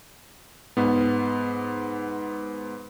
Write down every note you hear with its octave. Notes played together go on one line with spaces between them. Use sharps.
G#2 B3